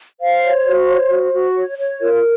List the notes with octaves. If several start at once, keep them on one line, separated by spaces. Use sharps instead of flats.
C5 F5
C#5
F#4
C#5
F#4
F#4
C#5
C#5
F4 A#4